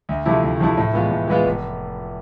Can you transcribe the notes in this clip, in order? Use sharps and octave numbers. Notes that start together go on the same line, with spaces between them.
D2
C3 F3 A3 E4
D2
C3 F3 A3 E4
A2
E3 G#3 B3 F4
A2
E3 G#3 B3 F4
F1